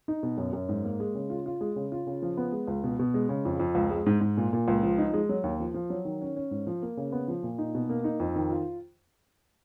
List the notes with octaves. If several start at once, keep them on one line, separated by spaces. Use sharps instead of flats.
D#4
B2
F#2
F#2
G#2
A#3
G#3
C#3
F4
F4
G#3
C#3
F4
C#3
F3
B3
G#3
C#2
B2
B2
G#3
C#3
F2
F2
C#2
G#3
G#2
G#2
A#2
A#2
C#2
F3
D#4
G#3
F#3
D#2
F3
F3
F#3
D#3
C#4
C#4
G#2
F3
A#3
C#3
B3
F3
A#2
D#4
B2
A#3
D#4
F2
D#3
F4